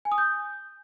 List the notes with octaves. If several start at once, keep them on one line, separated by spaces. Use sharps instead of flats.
G#5
D#6
G6